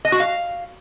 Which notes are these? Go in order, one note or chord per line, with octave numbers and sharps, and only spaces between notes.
D#5
F#4
F5